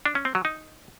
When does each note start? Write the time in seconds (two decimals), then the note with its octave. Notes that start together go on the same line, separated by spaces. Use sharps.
0.06 D4
0.15 C#4
0.25 C4
0.35 F#3
0.45 D#4